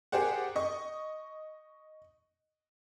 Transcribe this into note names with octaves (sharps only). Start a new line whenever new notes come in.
G4 G#4 A#4 C5 D5 F#5
D#5 C#6